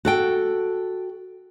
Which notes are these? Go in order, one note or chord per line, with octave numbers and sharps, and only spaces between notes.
F#4 A4 G5